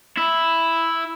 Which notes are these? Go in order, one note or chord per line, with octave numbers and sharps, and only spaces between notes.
E4